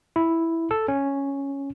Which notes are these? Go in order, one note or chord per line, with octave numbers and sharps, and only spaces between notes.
E4
A4
C#4